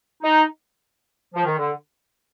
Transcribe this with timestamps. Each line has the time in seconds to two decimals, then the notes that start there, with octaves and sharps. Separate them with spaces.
0.23 D#4
1.34 F3
1.45 D#3
1.57 D3